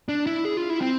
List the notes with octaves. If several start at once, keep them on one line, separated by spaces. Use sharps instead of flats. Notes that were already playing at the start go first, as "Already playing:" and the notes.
D4
E4
G#4
F4
E4
C4